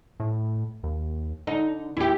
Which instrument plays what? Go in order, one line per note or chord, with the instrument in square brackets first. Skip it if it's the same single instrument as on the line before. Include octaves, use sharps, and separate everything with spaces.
[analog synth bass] A2
D#2
[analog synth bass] D3 [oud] D#4
[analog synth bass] D#2 [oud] E4 G4